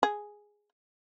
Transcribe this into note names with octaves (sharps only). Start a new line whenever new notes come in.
G#4